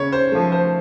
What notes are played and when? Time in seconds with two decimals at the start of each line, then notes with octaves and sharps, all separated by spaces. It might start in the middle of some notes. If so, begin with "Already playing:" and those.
Already playing: C#3 C#5
0.12 C5
0.32 F3 A3
0.52 C5